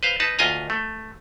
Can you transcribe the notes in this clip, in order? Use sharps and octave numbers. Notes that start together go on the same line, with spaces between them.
B4 C5 F5
D#4 B4 A5
D2 F4 D#5 G#5 A#5
A3